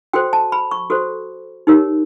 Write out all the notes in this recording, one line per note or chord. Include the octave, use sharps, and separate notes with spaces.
F#4 A4 C5 G5
A5
B5
C#6
F#4 A4 C5
D#4 G4 A#4 C#5